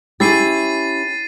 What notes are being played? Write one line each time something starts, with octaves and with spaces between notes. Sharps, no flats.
C#4 E4 G4 A6 C7 D#7